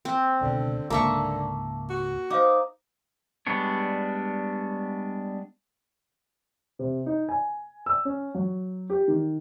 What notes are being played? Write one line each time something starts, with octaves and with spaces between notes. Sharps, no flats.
C4
C#2 B2 D3 D4
C#2 G#2 D3 A#3 E5 A5 C#6
F#4
D#4 C5 F5 D6
G3 G#3 B3 D4 C#5
C3
D#4
G#5
E6
C#4
F#3
G4
D#3